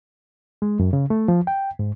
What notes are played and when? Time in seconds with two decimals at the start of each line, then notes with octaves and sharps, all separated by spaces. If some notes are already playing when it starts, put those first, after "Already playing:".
0.62 G#3
0.80 F#2
0.93 C#3
1.10 A3
1.28 F3
1.47 G5
1.79 G#2